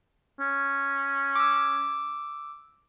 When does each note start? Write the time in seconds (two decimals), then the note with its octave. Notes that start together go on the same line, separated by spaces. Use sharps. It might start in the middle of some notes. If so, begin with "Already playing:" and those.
0.40 C#4
1.36 D6 E6